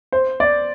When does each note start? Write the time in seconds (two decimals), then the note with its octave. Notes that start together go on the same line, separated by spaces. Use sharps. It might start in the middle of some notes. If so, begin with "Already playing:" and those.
0.12 C5
0.40 D5